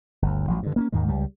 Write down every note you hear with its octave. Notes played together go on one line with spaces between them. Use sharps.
G1 D2
A1 F3 F#3
G2 D3
A#3 C4 C#4
D#2 G#2 D#3 G#3
C#2 G3